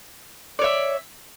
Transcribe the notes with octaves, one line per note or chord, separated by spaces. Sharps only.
C#5 D5 E5